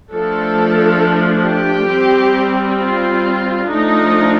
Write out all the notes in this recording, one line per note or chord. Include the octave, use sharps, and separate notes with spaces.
F3 A3 D4 A4
G4
G3 C4
F4
F3 A3 D4 D#4